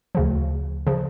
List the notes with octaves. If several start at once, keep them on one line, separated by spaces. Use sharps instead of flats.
D2 C#3 F3
C#3 F3